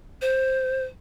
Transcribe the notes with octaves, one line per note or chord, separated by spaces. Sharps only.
C5